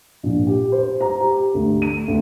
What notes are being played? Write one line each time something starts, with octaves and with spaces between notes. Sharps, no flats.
A#1
G4
C5
A#5
G4
D2
D#7
D2